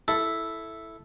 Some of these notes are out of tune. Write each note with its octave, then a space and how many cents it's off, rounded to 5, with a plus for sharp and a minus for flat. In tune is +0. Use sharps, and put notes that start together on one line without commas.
E4 +0 A4 +0